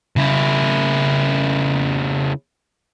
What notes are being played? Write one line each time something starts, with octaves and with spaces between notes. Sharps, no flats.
C#3 E4